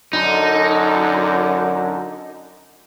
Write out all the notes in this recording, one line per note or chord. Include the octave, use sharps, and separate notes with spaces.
F#2 D3 D#4